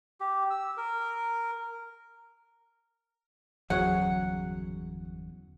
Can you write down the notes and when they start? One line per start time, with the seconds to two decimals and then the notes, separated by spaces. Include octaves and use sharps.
0.20 G4
0.50 E6
0.77 A#4
3.70 G1 E2 C#3 F#3 G#4 C#5 F#5